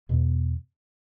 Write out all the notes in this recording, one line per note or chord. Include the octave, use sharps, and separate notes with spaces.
E2 B2 B3